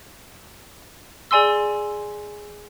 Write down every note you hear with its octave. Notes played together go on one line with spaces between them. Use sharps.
G#4 D5 G#5 C6 E6